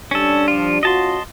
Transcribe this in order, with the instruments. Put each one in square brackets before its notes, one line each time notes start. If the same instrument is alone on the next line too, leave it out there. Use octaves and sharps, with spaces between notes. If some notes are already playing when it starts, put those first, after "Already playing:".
[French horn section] G3 D4 [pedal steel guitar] C#4 A4
[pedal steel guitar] F3 F4
[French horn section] C#4 F4 F#4 [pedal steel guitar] D#5 A5 C6